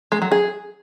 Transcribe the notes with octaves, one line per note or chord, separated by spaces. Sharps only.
G#3
F#3
G#4